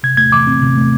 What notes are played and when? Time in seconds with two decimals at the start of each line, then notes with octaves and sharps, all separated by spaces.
0.03 C3 G#6
0.17 A3 G#6
0.32 E3 D6
0.47 C4
0.61 C3
0.77 A3